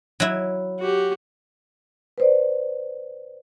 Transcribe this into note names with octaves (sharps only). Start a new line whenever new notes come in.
F#3 E4
F#4 G4
B4 C5 D5